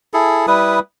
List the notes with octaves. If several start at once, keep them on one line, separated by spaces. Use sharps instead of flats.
E4 G#4 A4
G3 E4 B4 D#6